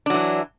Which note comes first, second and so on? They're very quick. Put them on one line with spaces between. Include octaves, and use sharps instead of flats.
D4 F#3 E3